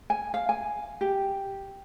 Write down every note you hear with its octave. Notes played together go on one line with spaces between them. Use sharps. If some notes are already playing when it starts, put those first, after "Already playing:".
G#5
F5
G#5
G4